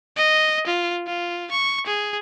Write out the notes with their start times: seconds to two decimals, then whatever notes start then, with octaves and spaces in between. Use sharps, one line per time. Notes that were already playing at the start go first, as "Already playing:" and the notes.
0.16 D#5
0.66 F4
1.07 F4
1.51 C#6
1.87 G#4